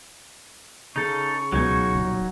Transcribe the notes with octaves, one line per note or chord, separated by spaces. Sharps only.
C#3 D#4 A4 C#6
C#2 B2 F#3 D#4 G#5
D#1